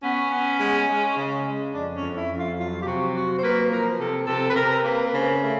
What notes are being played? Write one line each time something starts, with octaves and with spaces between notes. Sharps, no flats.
B3 C#4
B3
G#3
G#3
C#3
G#3
F2 D4
C#4
F2
E4
F2
F4
F#3 F4
G4
C3 F#4
F#3 F#4
C5
A#3 B4
F3 A#4
C3 A4
C3 A4
B4
C3 A#4
A#3 B4
B4
C#3 C5
A3